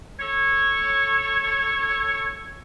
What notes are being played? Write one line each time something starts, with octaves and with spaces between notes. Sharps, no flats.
A4 C#5